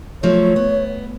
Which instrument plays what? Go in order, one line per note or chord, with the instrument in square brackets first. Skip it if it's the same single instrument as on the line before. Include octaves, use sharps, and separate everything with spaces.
[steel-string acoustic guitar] F3 F#3 A3 [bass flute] C#5
[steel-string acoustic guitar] B3